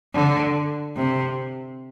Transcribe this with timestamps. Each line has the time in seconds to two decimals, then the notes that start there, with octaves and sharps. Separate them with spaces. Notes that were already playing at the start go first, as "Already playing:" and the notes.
0.15 D3
0.97 C3